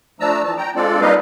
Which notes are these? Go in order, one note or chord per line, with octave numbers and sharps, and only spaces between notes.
F3 A3 D4 A5 A#5 E6
E3 A5
G5 A#5
G#3 C4 D4 F4 A4 D5
G3 A#3 D#4 B4 D#5 F5